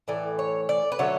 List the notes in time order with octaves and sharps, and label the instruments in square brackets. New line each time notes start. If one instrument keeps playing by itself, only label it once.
[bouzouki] A2 E3 D5
C#5
D5
B4
D3 F#3 A3 C#5